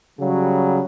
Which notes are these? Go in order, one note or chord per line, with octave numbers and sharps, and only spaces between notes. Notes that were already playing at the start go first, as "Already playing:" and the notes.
C#3 F#3 G3